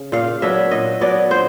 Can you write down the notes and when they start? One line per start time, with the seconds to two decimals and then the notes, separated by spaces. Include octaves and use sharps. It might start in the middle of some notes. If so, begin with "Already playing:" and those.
Already playing: C#3
0.12 A#2 F5
0.42 F#3 B3 D4 E5
0.71 A#2 D#5
1.01 F#3 B3 D4 D5
1.30 A#2 C5